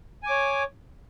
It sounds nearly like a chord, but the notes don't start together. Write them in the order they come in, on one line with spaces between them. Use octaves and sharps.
G#5 D6 C#5